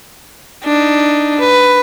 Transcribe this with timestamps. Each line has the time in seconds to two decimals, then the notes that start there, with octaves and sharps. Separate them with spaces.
0.64 D4 D#4
1.39 B4